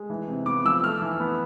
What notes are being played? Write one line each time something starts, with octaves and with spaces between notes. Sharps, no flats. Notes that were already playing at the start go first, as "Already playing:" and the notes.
Already playing: G#3
E3
C3
B3 D6
F3 E6
A3 F6
E3
B3